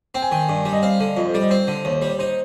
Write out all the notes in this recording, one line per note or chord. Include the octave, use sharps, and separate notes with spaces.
C4 G5
G#5
D#3 G5
G2
G3
D#5
C4 F5
D3
F2 D#5
C5
G3 D5
D#5
C4 C5
D3
D#2
G3
D#4 C5